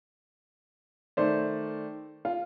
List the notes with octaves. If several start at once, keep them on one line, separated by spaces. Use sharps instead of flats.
D#3 A3 C5 D5
F4